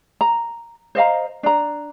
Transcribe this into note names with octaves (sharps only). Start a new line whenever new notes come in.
A#5
C5 D#5 F5 A#5
D4 A#5